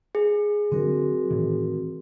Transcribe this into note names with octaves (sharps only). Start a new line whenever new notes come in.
G#4
D3 F#3 C4 F#4 A#4
A2 D#3 E3